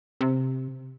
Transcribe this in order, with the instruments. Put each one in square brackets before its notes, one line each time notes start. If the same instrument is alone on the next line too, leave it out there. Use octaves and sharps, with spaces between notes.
[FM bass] C3